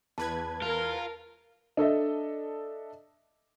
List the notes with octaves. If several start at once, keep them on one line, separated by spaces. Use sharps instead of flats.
E2 B4 A5 G#6
F4 A#4
D4 A4 D#5 E5